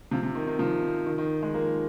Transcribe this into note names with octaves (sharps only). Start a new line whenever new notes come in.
C3 F3
C3
D#3
D#3
C3 F3
D#3
D#3
D#3 G#3
F3 A#3